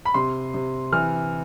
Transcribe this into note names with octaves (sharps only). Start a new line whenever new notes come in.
B5
C3 C6
C3
E3 F6